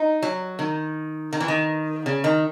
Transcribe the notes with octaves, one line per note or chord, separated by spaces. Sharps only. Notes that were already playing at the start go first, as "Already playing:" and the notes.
Already playing: D#4
F#3
D#3
D#3
E3
D#3
C#3
D#3